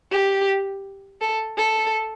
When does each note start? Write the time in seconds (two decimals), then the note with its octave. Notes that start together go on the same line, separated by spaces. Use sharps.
0.11 G4
1.21 A4
1.57 A4